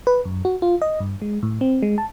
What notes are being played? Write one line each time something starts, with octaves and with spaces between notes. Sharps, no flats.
B4
F#2
F#4
F4
D#5
G2
G#3
A2
C4
G#3
A5